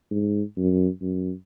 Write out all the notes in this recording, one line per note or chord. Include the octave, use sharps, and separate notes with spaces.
G#2
F#2
F#2